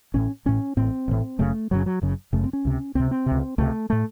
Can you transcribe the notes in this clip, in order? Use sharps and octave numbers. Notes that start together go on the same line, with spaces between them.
A1 A2 C#4
A1 A2 C#4
A1 A2 C4
A1 A2
F#1 F#2 C#3 A3
F#1 F#2 C#3 F#3
F#3
F#1 F#2 C#3
F#1 F#2 C#3 A3
C4
C#4
C#2 C3
C#2 C3 C4
C4
C3
C#2
C#2 C3 A3
A2 A3